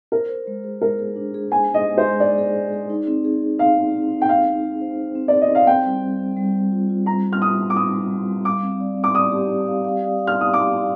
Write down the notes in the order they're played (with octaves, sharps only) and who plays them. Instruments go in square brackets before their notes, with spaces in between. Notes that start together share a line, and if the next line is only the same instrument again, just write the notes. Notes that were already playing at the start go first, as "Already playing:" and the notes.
[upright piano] A#4 [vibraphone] C5
[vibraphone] C5
G#3
G#4
[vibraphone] G#3 [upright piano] A#4
[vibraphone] G#4
D4
G#4
[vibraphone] C5 [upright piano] G#5
[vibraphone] G#3
[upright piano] D#5
[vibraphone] G#3
[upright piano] C5
[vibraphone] G#3
[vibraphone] G#4 [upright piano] D5
[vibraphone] G#4
G#3
G#4
D#4
C4
G#4
C4
[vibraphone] D#4 [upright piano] F5
[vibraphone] G#4
C4
D#4
[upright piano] G5
[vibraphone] D#4 [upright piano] F5
[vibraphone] D#4
G#4
C5
C5
C4
[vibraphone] G#4 [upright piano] D5
[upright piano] D#5
[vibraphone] C5 [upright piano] F5
[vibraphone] C4 [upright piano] G5
[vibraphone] G3
G3
C4
G3
G3
F4
F4
[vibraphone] G3 [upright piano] A#5
[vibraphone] G3
[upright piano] F6
[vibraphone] F4 [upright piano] D#6
[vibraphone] G3
[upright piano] D6
[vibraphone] C4 [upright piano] D#6
[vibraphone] G3
G3
G3
[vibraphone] F5 [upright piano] D6
[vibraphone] C4
D5
C4
[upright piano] D6
[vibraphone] D5 [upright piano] D#6
[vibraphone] G4
D5
F5
F5
D5
F5
[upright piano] F6
[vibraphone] D5 [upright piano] D#6
[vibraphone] F5 [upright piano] D6
[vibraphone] D5